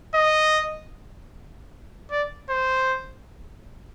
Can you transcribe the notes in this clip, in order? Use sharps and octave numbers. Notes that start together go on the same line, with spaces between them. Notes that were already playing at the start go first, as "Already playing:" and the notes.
D#5
D5
C5